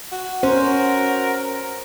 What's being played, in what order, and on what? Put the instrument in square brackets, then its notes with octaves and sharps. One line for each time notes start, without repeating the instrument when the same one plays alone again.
[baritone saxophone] F#4
[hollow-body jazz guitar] C#4 [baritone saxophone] F#4 [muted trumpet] A#4 [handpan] C5